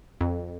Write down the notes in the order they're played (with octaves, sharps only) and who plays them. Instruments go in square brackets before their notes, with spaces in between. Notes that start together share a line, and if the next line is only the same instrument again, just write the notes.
[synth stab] F2